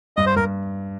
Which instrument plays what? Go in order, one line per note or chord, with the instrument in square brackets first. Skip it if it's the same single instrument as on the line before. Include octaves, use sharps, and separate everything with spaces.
[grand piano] G2 [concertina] D#5
[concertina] C5
[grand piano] G2 [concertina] A#4